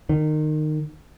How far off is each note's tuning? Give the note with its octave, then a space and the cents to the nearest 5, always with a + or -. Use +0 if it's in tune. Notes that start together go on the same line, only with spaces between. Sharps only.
D#3 -25